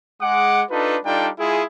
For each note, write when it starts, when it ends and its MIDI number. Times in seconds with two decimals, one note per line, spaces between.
0.21 0.63 56
0.21 0.63 78
0.21 0.63 86
0.70 0.97 62
0.70 0.97 63
0.70 0.97 65
0.70 0.97 69
0.70 0.97 71
1.05 1.29 55
1.05 1.29 62
1.05 1.29 63
1.05 1.29 65
1.05 1.29 69
1.05 1.29 79
1.39 1.64 56
1.39 1.64 64
1.39 1.64 65
1.39 1.64 68